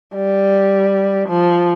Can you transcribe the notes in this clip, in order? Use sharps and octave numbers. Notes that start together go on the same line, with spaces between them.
G3
F3